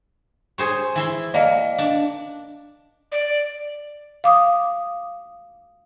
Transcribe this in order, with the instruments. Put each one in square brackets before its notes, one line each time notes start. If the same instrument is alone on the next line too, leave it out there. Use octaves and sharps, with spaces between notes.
[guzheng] G#4 C5 C#5
E3 E4 C6
[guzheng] A#3 [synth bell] D5 D#5 F5
[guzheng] D4
[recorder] D5
[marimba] F5 D6 D#6